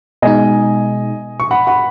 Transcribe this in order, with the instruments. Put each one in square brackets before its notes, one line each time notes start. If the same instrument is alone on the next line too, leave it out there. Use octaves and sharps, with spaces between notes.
[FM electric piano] B2 G#3 D#4 [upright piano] D#5 G#5
[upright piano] C#6
F#5 B5
F#5 B5